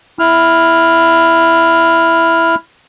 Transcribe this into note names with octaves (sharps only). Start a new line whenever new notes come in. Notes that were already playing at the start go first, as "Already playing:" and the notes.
E4 F6